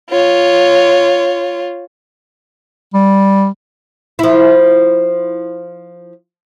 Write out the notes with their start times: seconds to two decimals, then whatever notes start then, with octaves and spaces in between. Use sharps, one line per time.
0.11 F4 C#5
2.94 G3
4.19 F3 E4